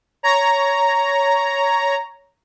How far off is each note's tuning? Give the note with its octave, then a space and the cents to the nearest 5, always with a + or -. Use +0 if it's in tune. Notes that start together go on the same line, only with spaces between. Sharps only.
C#5 +10 A#5 +0